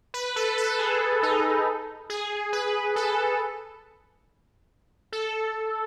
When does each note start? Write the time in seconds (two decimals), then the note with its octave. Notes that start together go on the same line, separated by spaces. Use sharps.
0.14 B4
0.36 A4
0.58 A4
0.79 G#4
1.23 D#4
2.10 G#4
2.53 B4
2.96 A4
5.12 A4